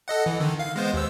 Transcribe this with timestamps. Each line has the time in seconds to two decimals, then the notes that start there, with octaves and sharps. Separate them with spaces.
0.08 A4 D#5 F#5
0.26 E3
0.40 D3 D#3
0.59 F5
0.76 G#3 B3 C5
0.94 D#2 E6